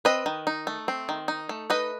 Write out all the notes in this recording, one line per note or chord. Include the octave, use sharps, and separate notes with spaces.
C4 B4 D#5
D#3
D#4
A3
C4
D#3
D#4
A3
D#4 B4 D#5